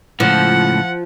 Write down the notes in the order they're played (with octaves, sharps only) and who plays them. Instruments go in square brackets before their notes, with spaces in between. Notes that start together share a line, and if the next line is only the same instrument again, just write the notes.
[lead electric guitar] C#2 A2 [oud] F3 [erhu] F#5